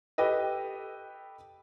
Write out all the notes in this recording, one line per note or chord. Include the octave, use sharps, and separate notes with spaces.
G4 A4 B4 D#5